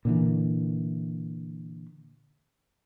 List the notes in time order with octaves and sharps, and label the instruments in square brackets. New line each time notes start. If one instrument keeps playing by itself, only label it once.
[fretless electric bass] A#2 D3 E3